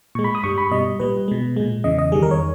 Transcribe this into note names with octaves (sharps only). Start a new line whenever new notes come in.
A#2 G#3 C#6
B5
D#6
G2 G3 C#6
B5
B2 G3 D#5
A#2 G3 B4
B2 G#3
A#2 G#3
E2 C#3 E3 D#5
D#5
E2 D#3 G3 G#4
A#4
C#5